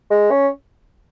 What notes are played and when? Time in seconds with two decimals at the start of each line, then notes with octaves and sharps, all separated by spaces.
0.10 G#3
0.31 C#4